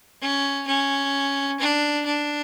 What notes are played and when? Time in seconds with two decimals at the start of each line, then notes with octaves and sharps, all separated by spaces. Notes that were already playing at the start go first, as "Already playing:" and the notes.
0.21 C#4
0.67 C#4
1.60 D4
2.06 D4